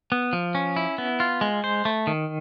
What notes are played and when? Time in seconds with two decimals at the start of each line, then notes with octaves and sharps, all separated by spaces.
0.12 B3
0.33 F3
0.55 C#4
0.76 E4
0.98 B3
1.20 F4
1.41 G#3
1.64 C5
1.85 A3
2.07 D#3